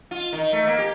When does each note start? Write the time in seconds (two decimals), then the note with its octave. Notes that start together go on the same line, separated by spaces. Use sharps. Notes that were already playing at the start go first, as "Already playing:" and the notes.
0.11 F4
0.33 D#3
0.53 A3
0.67 A#3
0.79 G4